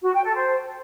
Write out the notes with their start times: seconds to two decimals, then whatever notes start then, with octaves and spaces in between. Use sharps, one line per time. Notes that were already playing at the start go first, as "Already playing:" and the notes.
0.03 F#4
0.14 G5
0.24 A4
0.35 C5